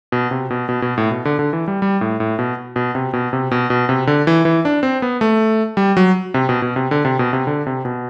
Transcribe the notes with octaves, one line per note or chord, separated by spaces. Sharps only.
B2
C3
B2
B2
B2
A2
B2
D3
D3
E3
G3
G3
A2
A2
B2
B2
C3
B2
C3
B2
B2
C3
D3
E3
E3
D4
C4
B3
A3
G3
F#3
C3
B2
B2
C3
D3
C3
B2
C3
D3
C3
B2